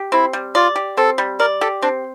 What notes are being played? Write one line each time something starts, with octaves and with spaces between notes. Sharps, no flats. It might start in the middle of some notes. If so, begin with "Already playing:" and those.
Already playing: G4
C4 E4
G3
F4 D5
G4
C4 A4
G3
A#4 D5
G4 A4
C4 D4